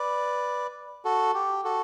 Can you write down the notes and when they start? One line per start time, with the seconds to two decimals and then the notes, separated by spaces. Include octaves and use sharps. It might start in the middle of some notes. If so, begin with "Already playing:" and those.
Already playing: B4 D5
1.05 F#4 A4
1.34 G4
1.64 F#4 A4